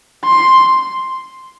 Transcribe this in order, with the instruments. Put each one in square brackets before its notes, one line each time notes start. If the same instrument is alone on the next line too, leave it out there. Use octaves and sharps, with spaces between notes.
[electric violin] C6